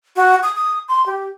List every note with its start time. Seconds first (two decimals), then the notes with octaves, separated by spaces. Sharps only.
0.16 F#4
0.43 D#6
0.55 D#6
0.88 C6
1.06 G4